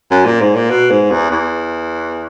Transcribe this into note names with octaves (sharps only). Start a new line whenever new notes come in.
F#2
A#2
G#2
A#2
B2
G#2
E2
E2